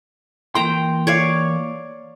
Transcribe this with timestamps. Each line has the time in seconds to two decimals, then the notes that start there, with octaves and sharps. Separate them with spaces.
0.55 E3 A#3 G5 A#5 C6
1.07 C#5 D5 F5